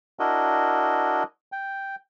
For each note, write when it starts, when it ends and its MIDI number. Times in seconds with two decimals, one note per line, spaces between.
0.19 1.23 62
0.19 1.23 64
0.19 1.23 66
0.19 1.23 70
0.19 1.23 75
1.52 1.95 79